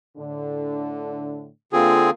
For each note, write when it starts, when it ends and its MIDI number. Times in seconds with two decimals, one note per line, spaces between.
0.17 1.48 45
0.17 1.48 50
1.73 2.10 50
1.73 2.10 58
1.73 2.10 60
1.73 2.10 65
1.73 2.10 68